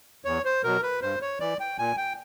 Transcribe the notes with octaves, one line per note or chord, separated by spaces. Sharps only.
E2 C#5
C5
B2 F#3 A#4
B4
G2 C5
C#5
E3 D5
G5
A#2 G#5
G5